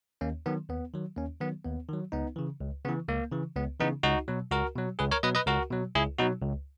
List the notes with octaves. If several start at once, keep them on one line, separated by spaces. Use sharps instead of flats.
D#2 A#3 C#4
D#3 F#3 B3
D#2 B3
D#3 F#3
D#2 A#3 C#4
D#3 F#3 B3
D#2 B3
D#3 F#3
C#2 B3 D#4
C#3 E3
C#2
C#3 E3 B3
C#2 A#3
C#3 E3
C#2 B3
C#3 E3 B3 D#4
C#2 D#4 F#4
B2 F#3
C#2 F#4 A#4
B2 F#3
C#2 G#4 B4
A#4 C#5
B2 F#3 B4 D#5
B4 D#5
C#2 F#4 A#4
B2 F#3
C#2 E4 G#4
B2 F#3 D#4 F#4
C#2